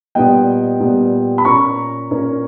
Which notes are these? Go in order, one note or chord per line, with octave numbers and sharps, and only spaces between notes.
A#2 G3 B3 D#5 G5
A#2 G3 B3
B5
A#2 A#3 C#4 A#5 C#6
A#2 A#3 C#4